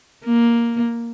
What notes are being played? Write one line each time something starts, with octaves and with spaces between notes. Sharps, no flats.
A#3